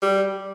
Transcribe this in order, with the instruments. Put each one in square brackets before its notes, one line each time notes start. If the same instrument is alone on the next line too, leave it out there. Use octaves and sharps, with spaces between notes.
[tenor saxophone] G3